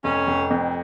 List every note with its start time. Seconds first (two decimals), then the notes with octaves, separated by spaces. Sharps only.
0.04 F1 C#4
0.27 F1
0.50 F2